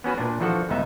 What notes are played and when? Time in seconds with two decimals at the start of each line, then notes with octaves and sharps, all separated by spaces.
0.04 B3 C#4 F#4 B4
0.18 A#2 D4
0.40 E3 F3 D4 F#4 A4 F#5
0.69 G1 C#2 B3 D#4 E5